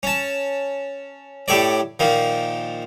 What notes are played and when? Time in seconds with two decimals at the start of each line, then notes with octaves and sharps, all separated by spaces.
0.03 C#4 A5
1.48 A2 G4 A4 C#5 D5
2.00 A#2 D#3 F3